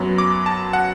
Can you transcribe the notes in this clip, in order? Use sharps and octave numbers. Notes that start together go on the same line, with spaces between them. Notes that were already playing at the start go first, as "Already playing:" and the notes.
Already playing: F#2 F#3 B3
D6
A5
F#5